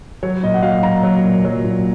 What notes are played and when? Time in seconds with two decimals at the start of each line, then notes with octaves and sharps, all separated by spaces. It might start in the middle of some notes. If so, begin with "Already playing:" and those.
0.23 F#3 C#5
0.43 A#2 D#5
0.54 F#5
0.63 F#3 F5
0.83 A#2 A#5
1.03 F#3
1.24 A#2
1.45 F#3
1.64 A#2